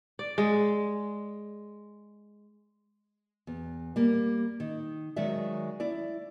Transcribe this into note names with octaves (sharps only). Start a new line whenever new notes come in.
D5
G#3
E2
G3 A#3
D#3
D#3 F#3 G#3 D5 E5
E4 D5